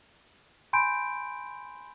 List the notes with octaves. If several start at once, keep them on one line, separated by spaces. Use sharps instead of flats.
G#5 B5 C6 G6 D7